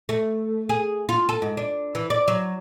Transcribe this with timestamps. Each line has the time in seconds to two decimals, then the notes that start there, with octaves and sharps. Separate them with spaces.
0.09 A3
0.69 G#4
1.09 F4
1.29 A4
1.42 G#2
1.57 D4
1.95 E3
2.10 D5
2.28 F#3